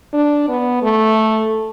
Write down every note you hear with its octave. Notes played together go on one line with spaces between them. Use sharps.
D4
B3
A3